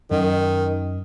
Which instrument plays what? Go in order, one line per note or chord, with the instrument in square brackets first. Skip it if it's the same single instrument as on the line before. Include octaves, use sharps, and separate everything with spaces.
[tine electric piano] F#2 [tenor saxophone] D#3